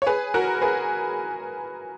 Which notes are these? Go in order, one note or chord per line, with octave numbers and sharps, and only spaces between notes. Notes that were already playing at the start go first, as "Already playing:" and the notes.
C#5
G#4 B4
F#4 A#4
G#4 B4